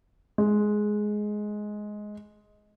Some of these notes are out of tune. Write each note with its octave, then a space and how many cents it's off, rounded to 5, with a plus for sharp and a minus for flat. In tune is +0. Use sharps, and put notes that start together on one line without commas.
G#3 +10